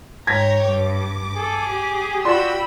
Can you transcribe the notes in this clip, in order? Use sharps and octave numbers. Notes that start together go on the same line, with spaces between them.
G#2 C#5 G5 A#5 G#6 A#6 B6
G2 D6
G#4 A4
G4
F4 F#4 D5 G5 B5 C6 E6